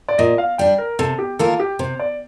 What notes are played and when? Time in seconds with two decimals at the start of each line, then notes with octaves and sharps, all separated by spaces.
0.08 D5
0.18 A#2 D#5
0.38 F5
0.58 G3 D4 G5
0.78 A#4
0.99 C3 A4
1.19 G4
1.39 D#3 A#3 F4 A4
1.60 G4
1.79 C3 C5
1.99 D5